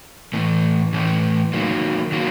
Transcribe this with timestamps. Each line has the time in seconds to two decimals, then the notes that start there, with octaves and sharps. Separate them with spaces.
0.33 A2 E3 A3
0.93 A2 E3 A3
1.53 D#3 F#3 A#3
2.12 D#3 F#3 A#3